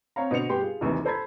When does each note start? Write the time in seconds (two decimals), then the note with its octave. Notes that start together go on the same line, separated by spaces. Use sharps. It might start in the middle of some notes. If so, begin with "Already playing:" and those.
0.16 C4 C#5 F5 A#5
0.31 B2 D3 C5 C#7 F7
0.49 G2 B3 G4 C6
0.62 F4 G#4
0.81 A#1 D#2 C3 E3
1.05 A4 C5 A#5 B5 G#6